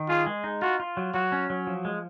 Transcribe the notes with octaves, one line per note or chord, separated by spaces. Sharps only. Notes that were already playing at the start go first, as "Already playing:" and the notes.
Already playing: D#3
F4 G#4
G#3
D#4
F4 F#4
F4
F#3
F#3 F#4
C#4
F#3
F3
G#3